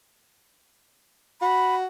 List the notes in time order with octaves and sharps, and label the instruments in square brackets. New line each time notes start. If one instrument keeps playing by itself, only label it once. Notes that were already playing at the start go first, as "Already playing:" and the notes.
[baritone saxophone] F#4 [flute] B5